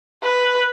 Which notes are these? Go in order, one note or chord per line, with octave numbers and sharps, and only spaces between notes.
B4